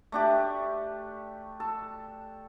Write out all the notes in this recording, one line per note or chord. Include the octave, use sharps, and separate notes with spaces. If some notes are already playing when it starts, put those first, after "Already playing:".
A3 D4 G4
A4